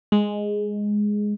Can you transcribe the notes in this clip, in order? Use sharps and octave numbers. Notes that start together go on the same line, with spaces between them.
G#3